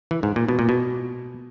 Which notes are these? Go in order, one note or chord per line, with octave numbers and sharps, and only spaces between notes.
E3
G#2
A#2
B2
A#2
B2